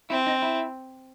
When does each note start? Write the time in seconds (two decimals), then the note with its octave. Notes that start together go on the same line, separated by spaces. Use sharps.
0.10 C4 E4
0.27 D#4
0.42 E4